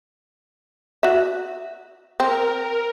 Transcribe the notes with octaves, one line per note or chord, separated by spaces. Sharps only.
F#4 E5
C4 A#4